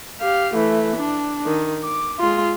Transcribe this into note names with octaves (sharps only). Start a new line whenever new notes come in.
G4 F5
E3 A3
D4
D#3
D6
G#3 F4